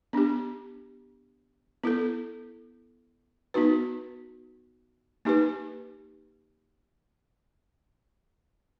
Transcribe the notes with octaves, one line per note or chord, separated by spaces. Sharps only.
B3 D4 G4
B3 E4 A4
B3 D#4 F#4 B4
A#3 D#4 G4 B4